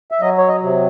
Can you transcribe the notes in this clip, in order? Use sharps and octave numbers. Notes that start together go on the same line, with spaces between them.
E5
F#3 D#5
C#5
D#5
C3